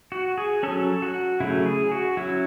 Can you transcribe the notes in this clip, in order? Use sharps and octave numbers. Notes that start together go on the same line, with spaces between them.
F#4
G#4
F#3 C#4 A4
F#4
C#3 F#3 A3 E4
G#4
F#4
F#3 C#4 E4